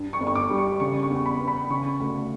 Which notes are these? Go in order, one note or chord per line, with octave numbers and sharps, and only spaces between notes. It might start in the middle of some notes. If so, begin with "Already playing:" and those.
Already playing: G2
C#6
G1
C#6
D6
G3
C#6
C#3 C#6
C#6
E2
B5
B3
B5
C#3 C#6
D2